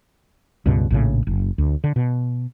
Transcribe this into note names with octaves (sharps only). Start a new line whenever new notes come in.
C#2 G2 B2
A#1 A2 C#3
F#1
D2
D3
B2